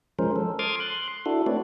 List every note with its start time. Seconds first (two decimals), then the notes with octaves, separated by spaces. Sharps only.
0.19 F3 G#3 C#4 A#4 C5
0.36 A4
0.59 C6 D6 D#6 F6 G#6 A6
0.80 C6 F#6
1.26 D4 E4 F#4 A4
1.46 A3 C4 B4 C#5 D5